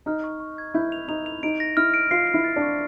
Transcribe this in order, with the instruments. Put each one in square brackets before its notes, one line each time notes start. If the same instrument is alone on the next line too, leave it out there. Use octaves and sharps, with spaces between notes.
[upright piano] D#4 [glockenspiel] F6
[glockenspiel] C#6
C#6
G#6
[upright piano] E4 [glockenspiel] G6
[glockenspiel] F7
[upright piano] D#4 [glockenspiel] F7
[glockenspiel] F7
[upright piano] D#4 [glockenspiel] D7
[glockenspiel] A#6
[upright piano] E4 [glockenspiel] F6
[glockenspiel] D7
[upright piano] F4 [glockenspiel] C7
[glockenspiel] C7
[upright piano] E4
[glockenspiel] A6
[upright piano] D4
[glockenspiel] C#6